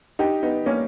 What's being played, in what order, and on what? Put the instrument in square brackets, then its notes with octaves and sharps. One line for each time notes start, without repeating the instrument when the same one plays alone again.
[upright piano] D#4 G4
B3 D#4
A#3 C#4